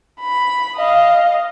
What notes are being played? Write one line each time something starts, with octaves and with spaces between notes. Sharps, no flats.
B5
D#5 F5